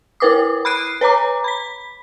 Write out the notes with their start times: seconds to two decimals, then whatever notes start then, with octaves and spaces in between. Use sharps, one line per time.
0.20 E4 A#4 B4 D6 D#6
0.65 B5 F6 F#6 C7 D7 D#7
1.01 B4 C#5 A#5 D6
1.44 B5 B6